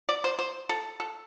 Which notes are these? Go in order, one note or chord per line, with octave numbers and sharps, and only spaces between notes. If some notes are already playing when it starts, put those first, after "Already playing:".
D5
C5
C5
A4
A4